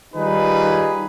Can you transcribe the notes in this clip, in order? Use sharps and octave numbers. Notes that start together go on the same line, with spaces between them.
D#3 G3 D#4 F4 G#4 B4